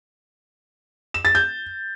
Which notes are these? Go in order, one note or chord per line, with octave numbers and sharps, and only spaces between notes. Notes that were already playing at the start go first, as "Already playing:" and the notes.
E7
A6
G6